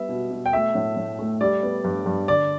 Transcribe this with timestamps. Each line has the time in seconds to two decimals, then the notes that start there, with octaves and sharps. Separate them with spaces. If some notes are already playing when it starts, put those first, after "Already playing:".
Already playing: G3 B3 E5
0.09 B2
0.31 B2
0.46 G5
0.53 A3 E5
0.75 A2
0.97 A2
1.19 A3
1.41 G3 D5
1.63 B3
1.84 G2
2.06 G2
2.28 D3 D5